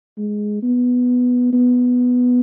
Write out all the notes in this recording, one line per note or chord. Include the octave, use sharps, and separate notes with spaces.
G#3
B3
B3